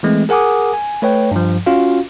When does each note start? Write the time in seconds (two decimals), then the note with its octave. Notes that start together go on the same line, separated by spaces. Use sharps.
0.03 E3 G#3 A3 C4
0.29 G#4 A#4 F#5 G#5 D6 D#6
0.73 G#5
1.02 A3 B4 C#5 G5
1.31 G2 F3
1.66 C#4 F4 F#4 F5